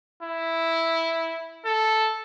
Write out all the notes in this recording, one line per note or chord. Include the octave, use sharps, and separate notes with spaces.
E4
A4